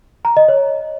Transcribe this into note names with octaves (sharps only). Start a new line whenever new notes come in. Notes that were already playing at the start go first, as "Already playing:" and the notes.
A#5
D#5
C#5